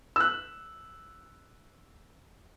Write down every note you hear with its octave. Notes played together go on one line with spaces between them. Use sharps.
E6 F#6